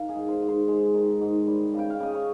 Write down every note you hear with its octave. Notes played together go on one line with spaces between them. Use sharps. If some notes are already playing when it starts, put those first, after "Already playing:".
Already playing: D#3 F5
G#4
G#2
C5
G#2
C5
G#3
D#3
G#2
G3
C#3 G5
F5
C#3 D#5
C#5